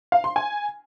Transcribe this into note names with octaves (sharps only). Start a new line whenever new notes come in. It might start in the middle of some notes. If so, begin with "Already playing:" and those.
F5
C6
G#5